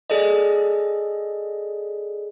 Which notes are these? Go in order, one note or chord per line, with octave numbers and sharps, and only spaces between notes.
G#4 A4 D5 D#5